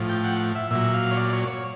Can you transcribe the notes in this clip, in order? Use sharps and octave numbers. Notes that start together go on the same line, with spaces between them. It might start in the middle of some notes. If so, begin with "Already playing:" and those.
Already playing: A2 F3
G5
F#5
E5
A#2 F#3 E5
F5
C#5
D5
C#5
C#5